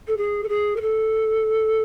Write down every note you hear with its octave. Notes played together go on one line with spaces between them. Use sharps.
A4
G#4
A4
G#4
A#4
A4